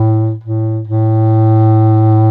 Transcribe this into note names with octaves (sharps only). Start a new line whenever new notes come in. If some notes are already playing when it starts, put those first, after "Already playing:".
Already playing: A2
A2
A2